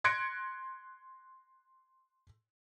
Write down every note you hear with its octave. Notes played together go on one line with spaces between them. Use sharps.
C6 F#6 G#6 A#6 C#7 D7